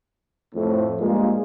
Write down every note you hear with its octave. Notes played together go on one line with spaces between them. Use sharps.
F2 A2
G2 A#2 G#3 A#3 F4